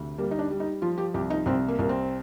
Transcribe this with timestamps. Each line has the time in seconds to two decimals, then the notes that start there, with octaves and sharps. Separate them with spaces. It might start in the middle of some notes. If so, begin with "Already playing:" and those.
Already playing: D2 C3
0.18 G3 A#3
0.31 D#4
0.39 D4
0.50 G3
0.60 D#4
0.82 F3 F4
0.98 G4
1.14 C2 G4
1.30 D#4
1.46 C2 C4
1.68 A#3
1.79 C2 A#3
1.89 C4